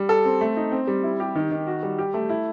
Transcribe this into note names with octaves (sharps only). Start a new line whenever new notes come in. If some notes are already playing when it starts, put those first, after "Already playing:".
Already playing: G3
A4
C4
A3
D#4
C4
G3
E4
G4
D#3
D#3
F#4
G3
G4
A3
E4